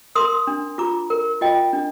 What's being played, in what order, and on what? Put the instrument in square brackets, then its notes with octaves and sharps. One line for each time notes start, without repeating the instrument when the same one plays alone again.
[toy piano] A#4 C6 D#6
D4
F4 A#5 D6
A#4
F4 D#5 G5
D4